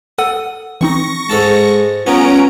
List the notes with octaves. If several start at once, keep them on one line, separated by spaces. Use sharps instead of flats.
A4 F#5 D#6 E6
E3 C4 D#4 C#6 A#6
G#2 G#3 A4 A5
G3 A3 B3 C#4 F4 A#5 D7